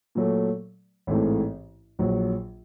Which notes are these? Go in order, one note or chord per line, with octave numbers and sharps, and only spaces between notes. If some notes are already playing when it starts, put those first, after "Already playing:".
A#2 F#3 A3
A1 G#2 E3 A3 C4
A#1 A#2 F#3